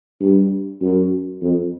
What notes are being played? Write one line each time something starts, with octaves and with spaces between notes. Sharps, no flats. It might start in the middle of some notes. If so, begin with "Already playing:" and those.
G2
F#2
F2